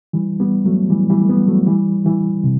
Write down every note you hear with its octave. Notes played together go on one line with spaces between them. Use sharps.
E3 G3
G3 B3
F#3 A3
E3 G3
E3 G3
A3
G3 B3
F#3 A3
E3 G3
E3 G3
C3